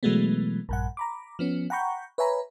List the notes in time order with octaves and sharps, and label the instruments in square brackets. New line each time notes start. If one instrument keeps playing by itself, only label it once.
[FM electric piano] B2 E3 F#3 G#3 A3 B3
A#1 G2 F#5
A#5 B5 D6
F3 B3 C#4
F#5 G5 A#5 B5 C#6 G6
B4 C#5 E5 G#5 A#5 B5